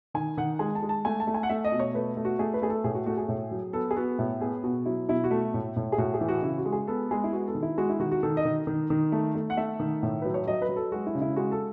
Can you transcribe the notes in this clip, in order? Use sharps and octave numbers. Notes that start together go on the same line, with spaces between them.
D#3 G#5
D#3 F#5
G#3 G#5
A5
G#3
A5
A3 G#5
A5
A3
G#5
F#5
A3 E5
D#5
B2
C#5
A3 B4
A3
F#4
A3 G#4
B4
A3 G#4
A4
A2 G#4
F#4
A3 F#4
G#4
A2
F#3
B3 A4
G#4
B3 F#4
A2
B3 G#4
B2 F#4
F#3 E4
B2 E4
F#4
A3
A2
A2
G#4
A2 F#4
G#4
E3
F#4
C#3 E4
F#4
G#3
G#4
B3 A4
G#3 G#4
E4
B3 F#4
A4
D#3
E4
G#3 F#4
E4
D#3 F#4
F#4
D#3 A4
D#5
D#3
D#3
D#3
A3
A3
F#5
A3 E5
D#3
A2
F#3 B4
C#5
F#3 D#5
B4
F#3
A4
G#3 F#4
E4
C#3
E4
G#3 F#4
A4